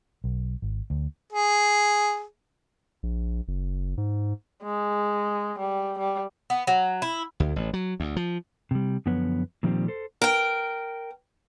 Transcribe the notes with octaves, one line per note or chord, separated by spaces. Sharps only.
B1
G#1
D2
G#4
A#1
F#1
G#2
G#3
G3
G3
B3
F#3
E4
D2
A1
F#3
D2
F3
C3 G3
F#2 D3 F3 B3 B4 C#5
A#2 D#3 F3 G3 B3 C4
A4 C5
A#4 G5